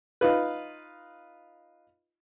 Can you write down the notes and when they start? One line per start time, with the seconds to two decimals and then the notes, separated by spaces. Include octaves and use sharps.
0.21 D#4 F4 B4